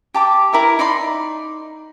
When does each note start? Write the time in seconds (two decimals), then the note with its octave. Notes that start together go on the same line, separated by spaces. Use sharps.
0.14 G4 A5 D6
0.53 E4 A#4 E5
0.79 D#4 D5 B5 C6